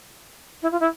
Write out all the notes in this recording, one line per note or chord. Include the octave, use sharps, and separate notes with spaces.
E4
F4
E4